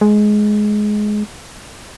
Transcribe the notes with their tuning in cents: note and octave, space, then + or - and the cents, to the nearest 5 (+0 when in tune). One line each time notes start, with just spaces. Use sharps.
G#3 +15